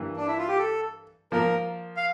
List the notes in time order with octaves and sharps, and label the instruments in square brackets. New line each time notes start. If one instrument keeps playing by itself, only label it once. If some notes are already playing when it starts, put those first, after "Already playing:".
Already playing: [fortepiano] G2 E3 A#3
[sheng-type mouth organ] D4
E4
F4
G4
A4
[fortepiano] F3 A#3 F4 [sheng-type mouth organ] A#4
[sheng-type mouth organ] F5